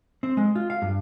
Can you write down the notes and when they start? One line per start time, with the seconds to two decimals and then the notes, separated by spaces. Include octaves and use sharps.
0.23 C4
0.37 G#3
0.55 F4
0.70 F5
0.82 G2